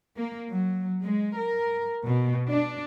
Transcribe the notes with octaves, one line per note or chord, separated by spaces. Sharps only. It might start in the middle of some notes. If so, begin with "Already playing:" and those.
A#3
F#3
G#3
A#4
B2
D4